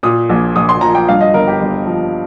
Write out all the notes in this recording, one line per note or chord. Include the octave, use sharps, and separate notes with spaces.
A#2 D#6
A#1
A#1 D#6
C6
F3 A#5
G5
G2 F5
D#5
G1 A#4
G4
G1
F3